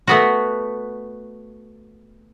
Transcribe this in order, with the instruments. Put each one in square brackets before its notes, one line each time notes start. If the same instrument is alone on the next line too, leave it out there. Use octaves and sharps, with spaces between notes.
[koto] A3 B3 F#4